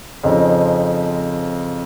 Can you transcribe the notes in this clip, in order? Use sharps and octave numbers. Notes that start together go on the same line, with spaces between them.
F2 C#3 F3 C4 D#4